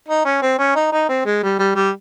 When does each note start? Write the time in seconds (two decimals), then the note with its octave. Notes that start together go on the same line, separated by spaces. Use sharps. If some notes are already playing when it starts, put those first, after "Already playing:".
0.08 D#4
0.25 C#4
0.42 C4
0.59 C#4
0.76 D#4
0.92 D#4
1.09 C4
1.26 G#3
1.43 G3
1.59 G3
1.76 G3